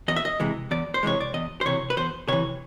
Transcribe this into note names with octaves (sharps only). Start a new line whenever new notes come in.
E2 D#5
E5
D#5
C3 E3 G#3
E2 D5
C5
C3 E3 G#3 C#5
D5
E2 D#5
C5
C3 E3 C#5
B4
E2 C5
C3 E3 C#5